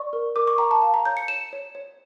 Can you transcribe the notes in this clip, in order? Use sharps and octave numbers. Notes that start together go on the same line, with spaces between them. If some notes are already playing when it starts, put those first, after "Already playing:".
Already playing: D5 C#6
A#4
A#4 D6
C#6
G5 A#5
A5
F5 A5
A#5
C#5 G6
C#7
C#5 E7
C#5
C#5